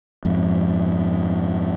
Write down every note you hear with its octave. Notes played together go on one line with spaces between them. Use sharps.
F2 G#2